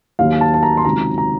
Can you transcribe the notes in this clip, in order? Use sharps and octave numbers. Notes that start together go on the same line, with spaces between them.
D#2 D#3 F#3 A#3 F5
A5
A5
A#5
C6
C#2 C3 D#3 F#3 A#5
A#5